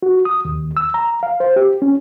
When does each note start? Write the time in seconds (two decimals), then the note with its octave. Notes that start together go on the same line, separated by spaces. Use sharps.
0.03 F#4
0.25 D#6
0.45 D#2
0.77 E6
0.94 A#5
1.23 F5
1.40 C5
1.56 G4
1.82 C#4